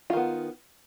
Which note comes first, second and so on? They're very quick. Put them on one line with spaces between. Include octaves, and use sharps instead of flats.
F4 D#3 B3